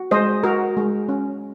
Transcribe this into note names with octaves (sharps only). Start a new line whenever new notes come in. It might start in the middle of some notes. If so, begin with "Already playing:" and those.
Already playing: F#4
G#3 C5 D#5
F#4 A#4
G#3
C#4